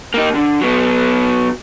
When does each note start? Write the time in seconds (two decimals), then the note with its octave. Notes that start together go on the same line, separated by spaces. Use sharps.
0.14 A#3 D#4
0.34 D3
0.61 F#3 B3